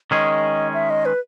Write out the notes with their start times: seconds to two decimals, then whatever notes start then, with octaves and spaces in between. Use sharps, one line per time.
0.11 D#3 G#3 C#4 G#4 D#5
0.74 E5
0.90 D#5
1.05 B4